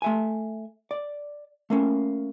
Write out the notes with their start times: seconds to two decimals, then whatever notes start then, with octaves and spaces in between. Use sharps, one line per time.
0.02 A3 E5 G#5
0.91 D5
1.70 A3 A#3 C#4